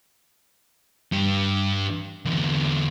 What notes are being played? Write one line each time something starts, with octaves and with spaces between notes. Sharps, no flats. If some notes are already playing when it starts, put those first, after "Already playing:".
G2 G4
E2 D3